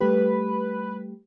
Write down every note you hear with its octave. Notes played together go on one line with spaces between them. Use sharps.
G3 A3 G4 B4